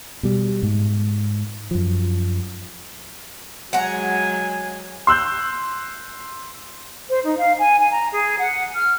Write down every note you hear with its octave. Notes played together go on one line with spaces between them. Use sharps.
B2 G3
G#2
F#2 F3
F#3 G#3 F#5 G#5 A#5
C6 E6 F#6 G6
C5
D#4
F5
G#5
G#5
A#5
G#4
F#5
F6